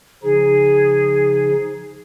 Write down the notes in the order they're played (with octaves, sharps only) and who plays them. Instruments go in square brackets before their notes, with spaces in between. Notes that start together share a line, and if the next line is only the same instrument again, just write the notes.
[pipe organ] C#3 F3 D#4 [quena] G#4